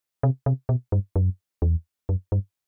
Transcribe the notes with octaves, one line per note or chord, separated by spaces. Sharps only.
C3
C3
B2
G2
F#2
E2
F#2
G2